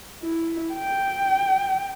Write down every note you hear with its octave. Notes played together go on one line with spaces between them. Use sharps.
E4
G5